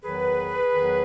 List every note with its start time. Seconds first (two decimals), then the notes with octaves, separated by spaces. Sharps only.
0.03 E2 D#3 F#3 G#4 B4
0.74 E2 D#3 F#3